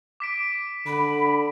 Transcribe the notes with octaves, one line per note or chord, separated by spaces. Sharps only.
D6 B6 D7
D3 B5